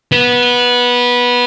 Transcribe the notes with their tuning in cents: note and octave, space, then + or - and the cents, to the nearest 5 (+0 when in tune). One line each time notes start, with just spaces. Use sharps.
B3 -15